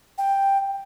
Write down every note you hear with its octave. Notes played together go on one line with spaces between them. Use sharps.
G5